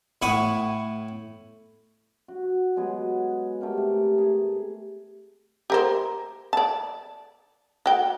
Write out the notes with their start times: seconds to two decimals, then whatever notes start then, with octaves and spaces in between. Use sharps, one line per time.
0.22 A2 E4 F#5 C#6 D#6
2.28 F#4
2.76 F#3 G#3 B3 G#4
3.61 A3 G4 A#4 G5
3.77 C3
4.18 G#4 A5
5.70 G4 A#4 C5
6.53 D5 A5
7.86 F#4 G5